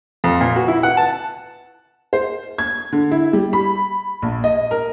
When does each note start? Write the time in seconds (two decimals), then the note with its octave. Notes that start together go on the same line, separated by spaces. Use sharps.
0.24 F2
0.41 A#2
0.56 F#4
0.68 E4
0.83 F#5
0.97 A5
2.13 C5
2.58 G#6
2.92 D3
3.11 E4
3.33 G3
3.53 B5
4.22 A#1
4.44 D#5
4.71 A#4